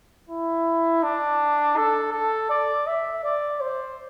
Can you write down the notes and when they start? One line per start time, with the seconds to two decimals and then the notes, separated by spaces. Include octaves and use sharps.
0.29 E4
1.03 D4
1.77 A4
2.13 A4
2.50 D5
2.87 E5
3.24 D5
3.61 C5